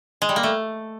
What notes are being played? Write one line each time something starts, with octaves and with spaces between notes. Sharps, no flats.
G#3
G3
A#3
A3